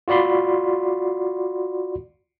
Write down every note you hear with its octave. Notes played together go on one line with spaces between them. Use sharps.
F4 F#4 D5 B5 C6